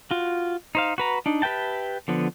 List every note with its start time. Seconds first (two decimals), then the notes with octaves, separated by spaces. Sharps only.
0.11 F4 F#4
0.75 D#4 C5 F5
0.98 F#4 B4 A#5
1.26 D4 D#4
1.42 G4 B4 E5 G5 A5
2.08 D3 F3 B3